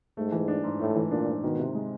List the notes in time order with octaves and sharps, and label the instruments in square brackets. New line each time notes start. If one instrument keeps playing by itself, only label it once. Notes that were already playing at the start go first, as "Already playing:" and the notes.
[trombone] G#2 [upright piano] A3
[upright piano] E3
D4
G#2
[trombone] A2 [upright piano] A3
[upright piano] E3
[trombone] A#2 [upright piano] D4
[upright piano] G#2
[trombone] B2 [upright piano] D#3
[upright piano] C3
G#3